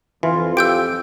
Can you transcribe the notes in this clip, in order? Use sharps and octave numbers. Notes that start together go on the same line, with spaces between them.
F2 E3 F4
G4 E6 G6 D7